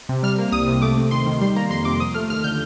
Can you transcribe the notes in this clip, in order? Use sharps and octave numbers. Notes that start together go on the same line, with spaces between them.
C3
G3 F6
A#3
C2 D#6
C3
A3 D6
C4
D#2 C6
D#3
G3 C6
A#3 A#5
F2 C6
C3 D6
F3 D#6
A3 F6
D#2 F6
D3 G6